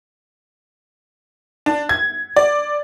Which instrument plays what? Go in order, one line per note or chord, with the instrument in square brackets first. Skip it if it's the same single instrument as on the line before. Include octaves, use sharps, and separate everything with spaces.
[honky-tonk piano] D4
G#6
D5